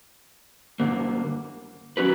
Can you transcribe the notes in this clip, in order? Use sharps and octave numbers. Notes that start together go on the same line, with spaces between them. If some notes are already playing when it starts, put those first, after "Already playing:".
G2 D3 A#3
F#3 C#4 F#4 B4